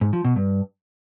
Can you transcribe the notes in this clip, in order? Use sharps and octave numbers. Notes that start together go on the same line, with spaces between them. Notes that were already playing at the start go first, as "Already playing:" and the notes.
G#2
F3
B2
G2